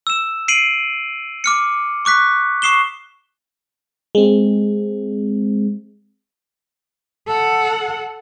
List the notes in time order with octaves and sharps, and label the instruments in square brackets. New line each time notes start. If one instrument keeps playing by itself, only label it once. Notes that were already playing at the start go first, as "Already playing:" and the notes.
[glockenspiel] E6 E7
C7 D7 D#7 F#7
D6 F6 C#7
C#6 D6 F#6 B6
C#6 D#6 C7 E7 G7
[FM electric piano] G#3 C4
[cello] A4 F#5